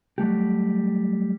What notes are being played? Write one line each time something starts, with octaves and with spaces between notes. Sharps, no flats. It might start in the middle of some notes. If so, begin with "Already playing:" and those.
F#3 G3 A3 G4